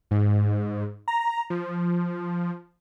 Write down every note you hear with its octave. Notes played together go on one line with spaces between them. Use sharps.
G#2
A#5
F3